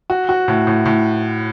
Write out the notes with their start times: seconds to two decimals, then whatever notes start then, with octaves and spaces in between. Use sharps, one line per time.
0.10 F#4
0.29 F#4
0.48 A2
0.67 A2
0.85 A2